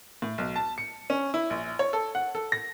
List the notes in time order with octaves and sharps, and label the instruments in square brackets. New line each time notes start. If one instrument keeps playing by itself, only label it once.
[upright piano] A2
B1
A5
C#7
C#4
E4
A#1
C#5
A4
F#5
A4
A#6